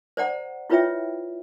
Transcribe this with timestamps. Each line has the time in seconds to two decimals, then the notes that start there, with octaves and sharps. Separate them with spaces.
0.17 C5 D5 F#5 A#5
0.70 E4 F4 B4 C#5 E5 G5